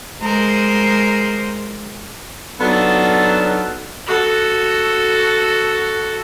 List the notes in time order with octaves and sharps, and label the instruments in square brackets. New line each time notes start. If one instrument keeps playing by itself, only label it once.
[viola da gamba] G#3 A#4 C5
[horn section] F#3 B3 D4 D#4 F4 A4
[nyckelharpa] F#4 A4